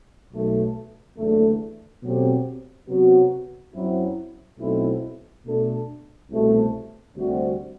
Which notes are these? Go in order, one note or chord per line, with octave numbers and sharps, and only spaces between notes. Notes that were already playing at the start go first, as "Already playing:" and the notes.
B1 B2 A3
F#1 E2 D3 A3
B2 F#3 A3 C4 G4
C3 F#3 B3 F#4
F#2 F#3 C4 E4
B1 B2 A3 C4 E4
B2 A3 D4 A4
C2 B2 A3
D2 C3 G3 C4 F#4